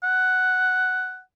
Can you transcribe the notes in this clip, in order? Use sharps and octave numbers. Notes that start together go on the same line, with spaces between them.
F#5